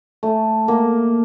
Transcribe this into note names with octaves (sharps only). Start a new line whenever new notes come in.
A3
A#3